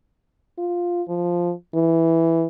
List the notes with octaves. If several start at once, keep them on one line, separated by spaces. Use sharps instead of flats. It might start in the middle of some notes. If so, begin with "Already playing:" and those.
F4
F3
E3